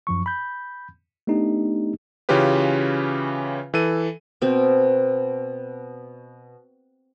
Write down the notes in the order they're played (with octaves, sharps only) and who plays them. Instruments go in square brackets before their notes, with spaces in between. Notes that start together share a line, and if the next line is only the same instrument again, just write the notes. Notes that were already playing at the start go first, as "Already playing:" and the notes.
[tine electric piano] F#2 F3 C#6
B5 G6
A3 B3 D4 D#4 G4
[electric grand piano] C#3 E3 C#4 F4 G4 B4
E3 A4 D#7
[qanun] B2 C4